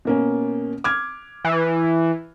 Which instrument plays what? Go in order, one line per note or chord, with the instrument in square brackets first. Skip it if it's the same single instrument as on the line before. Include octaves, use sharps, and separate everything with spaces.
[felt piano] B2 A#3 C#4
D6 F6 G#6
[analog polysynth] E3